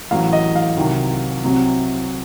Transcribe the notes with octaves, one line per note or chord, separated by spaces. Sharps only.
A1 A2 F#3 F5
D#5
F5
C2 C3 D#3 F#3
C2 C3 F#3